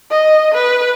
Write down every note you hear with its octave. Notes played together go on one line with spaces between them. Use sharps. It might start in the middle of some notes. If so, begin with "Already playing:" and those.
D#5
B4